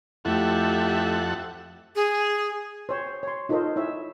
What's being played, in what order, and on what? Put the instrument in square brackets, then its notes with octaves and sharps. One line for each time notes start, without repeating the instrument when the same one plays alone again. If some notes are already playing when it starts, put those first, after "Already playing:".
[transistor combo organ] F2 A4 F#5 [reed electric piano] A3 E4 [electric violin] G4 E5
[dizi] G#4
[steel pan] C5 C#5
C#5 C6
D#4 F4 A4 A#4 C5 D#5
E4 C#5 E5